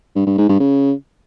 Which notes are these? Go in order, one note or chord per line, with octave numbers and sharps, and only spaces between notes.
G2
G2
G#2
G2
C#3